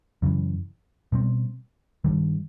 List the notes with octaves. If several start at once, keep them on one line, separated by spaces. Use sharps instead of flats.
F#2 C#3 E3
B2 G3 C4
G2 D#3 G3